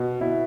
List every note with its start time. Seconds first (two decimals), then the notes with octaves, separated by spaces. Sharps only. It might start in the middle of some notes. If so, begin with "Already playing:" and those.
Already playing: B2
0.20 B2 E4